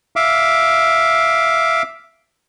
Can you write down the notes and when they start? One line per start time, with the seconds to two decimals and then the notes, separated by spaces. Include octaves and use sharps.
0.16 E5 F5 D6